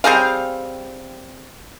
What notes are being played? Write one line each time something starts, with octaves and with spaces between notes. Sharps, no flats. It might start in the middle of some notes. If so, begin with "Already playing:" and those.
G3 C4 G#4 F5